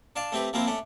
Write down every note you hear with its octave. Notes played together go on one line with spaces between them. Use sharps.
D4 D5 F5 A5
A3 C4 G4 B4
F3 A#3 C4 E4 F4
A3 C#4 D4